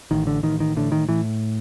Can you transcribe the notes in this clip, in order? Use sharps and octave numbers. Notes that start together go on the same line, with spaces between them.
A1 D#3
D3
A1 D#3
D#3
A2 D3
D#3
A2 E3